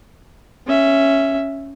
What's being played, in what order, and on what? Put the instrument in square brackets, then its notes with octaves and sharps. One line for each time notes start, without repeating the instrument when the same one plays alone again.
[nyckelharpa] C#4 E5